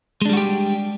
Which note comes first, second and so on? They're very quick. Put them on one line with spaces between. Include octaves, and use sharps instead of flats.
G#3 D4 G3 F#4 G4